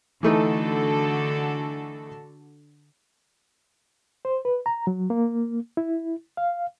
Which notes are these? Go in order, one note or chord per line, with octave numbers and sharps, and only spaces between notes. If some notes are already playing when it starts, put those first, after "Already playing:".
D3 E3 A3 D#4 F#4 A4
C5
B4
A#5
F#3
A#3
E4
F5